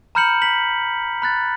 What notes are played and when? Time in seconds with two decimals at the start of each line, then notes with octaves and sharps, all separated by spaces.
0.15 A#5 B5 F6 G6 C#7 F#7
0.42 B6 F#7
1.22 B5 F#6 A6